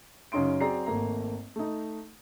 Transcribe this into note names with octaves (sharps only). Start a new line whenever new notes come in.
F#2 C#3 C#4 D#4 C6 D7
F#3 C4 G#4 D5 A#5 C7
G#1 A3 A#3 A#5
A3 D#4